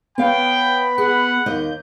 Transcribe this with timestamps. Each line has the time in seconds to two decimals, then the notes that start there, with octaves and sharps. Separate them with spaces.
0.18 B3 C#5 F5 G5 B5
0.98 G#4 F#5
1.46 D#2 A#3 D#5 G6